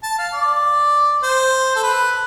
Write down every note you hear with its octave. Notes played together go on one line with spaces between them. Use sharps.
A5
F5
D5
C5
A4
B4